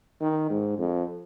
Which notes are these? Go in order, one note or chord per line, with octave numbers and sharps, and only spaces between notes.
D#3
G#2
F2